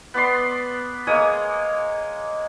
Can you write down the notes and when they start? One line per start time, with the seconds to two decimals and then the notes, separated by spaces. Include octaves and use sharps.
0.14 B3 D5 C6
1.07 G#3 A#3 C#5 D#6